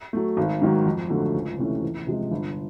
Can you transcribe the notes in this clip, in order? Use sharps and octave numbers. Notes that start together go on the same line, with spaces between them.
F#3 A3
G#1
G#2 D#3 F#3
F2
D3 F#3 A3
C#2
C3 E3 A3 C#4
E2
C3 F3 G#3
G1